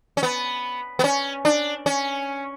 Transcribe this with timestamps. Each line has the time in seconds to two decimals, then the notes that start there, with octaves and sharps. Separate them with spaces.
0.17 C#4
0.23 B3
0.99 B3
1.04 C#4
1.45 D4
1.86 C#4